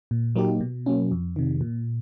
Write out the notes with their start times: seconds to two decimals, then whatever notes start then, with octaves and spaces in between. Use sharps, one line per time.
0.11 A#2
0.36 F#3 A#3 D#4 G4
0.60 B2
0.86 F#3 A#3 C#4
1.11 F2
1.36 C3 D#3
1.61 A#2